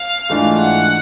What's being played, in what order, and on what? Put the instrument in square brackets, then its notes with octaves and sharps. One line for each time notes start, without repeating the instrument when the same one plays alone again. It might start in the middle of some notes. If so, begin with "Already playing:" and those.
Already playing: [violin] F5
[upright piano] G#2 E3 A3 D4 F4
[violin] F#5